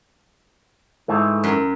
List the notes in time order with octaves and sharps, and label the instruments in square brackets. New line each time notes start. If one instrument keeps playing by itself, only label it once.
[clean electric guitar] G#2 E3 A3
[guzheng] F#2